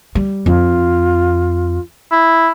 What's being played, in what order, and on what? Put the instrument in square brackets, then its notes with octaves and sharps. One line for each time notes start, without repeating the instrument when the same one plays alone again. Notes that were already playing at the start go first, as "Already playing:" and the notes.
[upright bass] G3
[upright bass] F2 [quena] F4
[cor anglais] E4